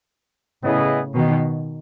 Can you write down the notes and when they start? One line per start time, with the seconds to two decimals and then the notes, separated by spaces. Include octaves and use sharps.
0.63 A2 C#3 B3 E4 G#4 D#5
1.15 B2 D#3